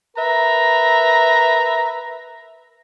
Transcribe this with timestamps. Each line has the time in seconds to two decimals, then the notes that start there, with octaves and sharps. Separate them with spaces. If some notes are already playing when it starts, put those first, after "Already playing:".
0.16 A#4 B4 E5 A#5